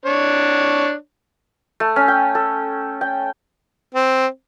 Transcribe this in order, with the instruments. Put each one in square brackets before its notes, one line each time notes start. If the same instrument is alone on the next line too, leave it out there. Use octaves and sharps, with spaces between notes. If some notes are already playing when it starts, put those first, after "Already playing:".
[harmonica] D4 C#5
[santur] A3
C#4
G5
A4
G5
[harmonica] C4